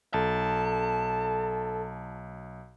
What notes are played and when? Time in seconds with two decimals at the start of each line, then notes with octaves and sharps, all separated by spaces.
0.14 B1 A4 A5